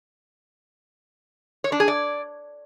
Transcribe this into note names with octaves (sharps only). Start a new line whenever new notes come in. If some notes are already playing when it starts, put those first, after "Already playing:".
C#5
D4
G#4
D5